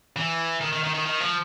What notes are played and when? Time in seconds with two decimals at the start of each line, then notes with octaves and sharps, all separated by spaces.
0.16 E3
0.61 D#3
0.73 D#3
0.84 D#3
0.95 D#3
1.06 D#3
1.20 F3